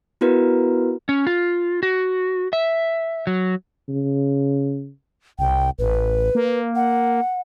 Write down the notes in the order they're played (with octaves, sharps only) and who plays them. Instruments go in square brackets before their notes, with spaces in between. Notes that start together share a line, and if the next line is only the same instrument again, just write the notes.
[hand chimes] B3 E4 F#4 A#4 B4
[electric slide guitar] C#4
F4
F#4
E5
F#3
[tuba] C#3
[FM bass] C2 [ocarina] G5
[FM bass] A1 [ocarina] B4
[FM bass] A#3
[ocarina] F#5